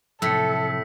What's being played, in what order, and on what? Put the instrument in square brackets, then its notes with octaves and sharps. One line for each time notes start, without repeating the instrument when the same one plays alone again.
[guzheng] A2 [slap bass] C3 F3 F#3 [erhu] A4 [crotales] E6 B6 C#7